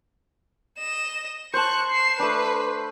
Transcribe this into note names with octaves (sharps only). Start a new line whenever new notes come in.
D#5 E7
C5 A5 C#6 F#6
C7 E7
A3 D4 B4